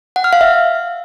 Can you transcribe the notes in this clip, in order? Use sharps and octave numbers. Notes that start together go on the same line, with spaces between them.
F#5
F6
F5
E5